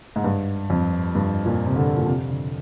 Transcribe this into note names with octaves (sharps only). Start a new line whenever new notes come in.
G#2
G2
F2
G2
A#2
C3
D3
A#2
C3
D3